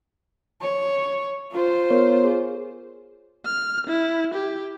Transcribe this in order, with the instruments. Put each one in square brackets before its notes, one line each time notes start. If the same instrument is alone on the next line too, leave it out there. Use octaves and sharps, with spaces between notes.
[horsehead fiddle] C#5
F4 C5
[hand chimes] B3 A#4 C#5
G#4
[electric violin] F6
E4
G4